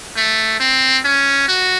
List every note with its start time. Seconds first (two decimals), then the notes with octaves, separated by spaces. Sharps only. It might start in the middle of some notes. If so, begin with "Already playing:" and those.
0.16 A3
0.60 C4
1.04 C#4
1.48 F#4